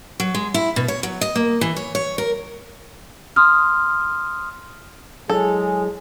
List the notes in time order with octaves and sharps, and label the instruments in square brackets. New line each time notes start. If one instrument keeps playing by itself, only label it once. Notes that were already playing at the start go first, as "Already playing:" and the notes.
[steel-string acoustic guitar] F#3
G#3
E4
B2
C#5
F#3
D#5
A#3
E3
C#5
C#5
A#4
[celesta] C6 D#6 F6
[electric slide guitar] F#3 E4 C#5 [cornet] G#3 [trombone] G#4 [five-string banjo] A4